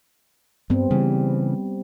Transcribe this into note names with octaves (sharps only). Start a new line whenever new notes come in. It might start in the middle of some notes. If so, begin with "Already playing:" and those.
G2 G3 B3 C4
C#3 E3 G3